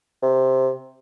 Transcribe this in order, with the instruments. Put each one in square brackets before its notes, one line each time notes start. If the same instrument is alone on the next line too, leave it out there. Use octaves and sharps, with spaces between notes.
[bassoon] C3